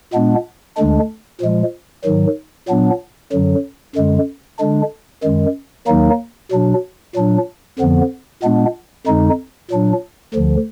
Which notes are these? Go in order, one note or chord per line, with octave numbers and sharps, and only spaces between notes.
A#2 G#3 B3 D4
D2 D3 G#3 D4
A#2 F3 G#3
G#2 D#3 F#3
A#2 F#3 B3 D4
F#2 D3 F#3
F#2 D3 G#3
D3 G#3 D4
F#2 D#3 G#3
D#2 D#3 F#3 A#3 D#4
B2 F#3 D4
A#2 F#3 D4
F2 D3 F3 B3
A#2 G#3 B3 D4
F2 D3 G#3 D#4
A#2 F#3 D4
D2 D3 F3